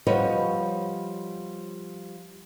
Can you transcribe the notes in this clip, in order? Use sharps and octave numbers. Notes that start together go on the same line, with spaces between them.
F3 G3 F#4 B4 C#5 D#5